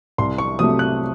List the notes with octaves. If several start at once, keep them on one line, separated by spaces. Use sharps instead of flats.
C2 C6
C#6
C3 F#3 A3 D#6
F#6